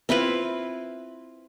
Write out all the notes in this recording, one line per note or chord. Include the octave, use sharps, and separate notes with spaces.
C4 E4 F4 B4